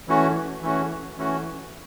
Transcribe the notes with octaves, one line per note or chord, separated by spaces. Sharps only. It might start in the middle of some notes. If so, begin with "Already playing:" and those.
E3 A3 C#4 F#4
E3 A3 C#4 F#4
E3 A3 C#4 F#4